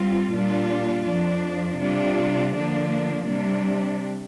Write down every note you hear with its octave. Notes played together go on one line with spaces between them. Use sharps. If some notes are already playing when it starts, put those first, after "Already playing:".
Already playing: G2 G3 C4 F4
A#2 G3 D4 F4
F2 F3 D4
C3 G3 D4 F4
D3 F3 A#3 D4
C3 G3 D4